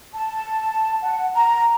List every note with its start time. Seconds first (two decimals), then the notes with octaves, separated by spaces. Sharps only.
0.14 A5
1.03 F#5
1.35 A#5